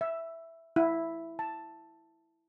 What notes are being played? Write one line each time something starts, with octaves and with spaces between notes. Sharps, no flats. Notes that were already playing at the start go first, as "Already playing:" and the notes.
E5
E4
A5